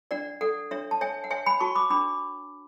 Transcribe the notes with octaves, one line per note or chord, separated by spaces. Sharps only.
D4 D5 F#5
A4 D5 F#5
D4 C#5 E5
A5
C#5 E5 G#5
F#5
C#5 E5 G#5
G#5 B5
F#4 A5 C#6
B5 D6
D4 B5 D6